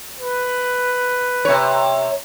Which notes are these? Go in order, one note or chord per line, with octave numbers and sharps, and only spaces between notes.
B4
C3 C#5